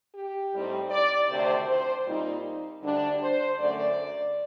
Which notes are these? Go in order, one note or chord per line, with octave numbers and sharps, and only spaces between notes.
G4
A2 G3 C4 D#4
D5
D2 C3 D#3 A3 C5
C5
A#2 G3 C4 D#4
D2 D3 G3 D4
C5
F#2 D3 A3 D5